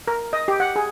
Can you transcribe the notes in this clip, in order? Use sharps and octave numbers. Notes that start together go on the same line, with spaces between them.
A#4
D#5
G4
F#5
G#4